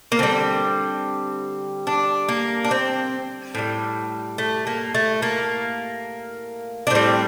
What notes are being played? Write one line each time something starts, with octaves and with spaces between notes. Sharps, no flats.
A#3
D3 G3 C4
D4
A#3
D4
C4
A2 E3 G3
A3
A#3
A3
A#3
D4
A2 G3 C4